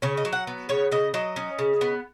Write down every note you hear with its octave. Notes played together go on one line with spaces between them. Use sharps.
C#3 C#5
D#5
F#3
F#5
B3
C#3 C#5
C#3 D#5
F#3 D#5
C#4
C#3
B3